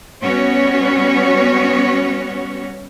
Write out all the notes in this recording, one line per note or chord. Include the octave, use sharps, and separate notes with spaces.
G3 B3 C#4 F#4 C#5